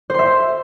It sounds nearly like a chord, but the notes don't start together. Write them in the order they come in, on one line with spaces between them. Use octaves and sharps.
C5 C6 E5